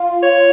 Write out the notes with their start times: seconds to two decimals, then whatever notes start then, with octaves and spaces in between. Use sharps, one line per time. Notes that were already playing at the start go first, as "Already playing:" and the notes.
Already playing: F4
0.23 C#5